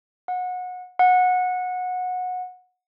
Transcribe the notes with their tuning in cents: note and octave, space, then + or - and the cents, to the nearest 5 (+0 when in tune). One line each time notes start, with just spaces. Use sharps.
F#5 -25
F#5 -20